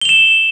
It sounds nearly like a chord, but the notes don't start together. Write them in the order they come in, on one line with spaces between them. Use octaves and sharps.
G7 F7 E7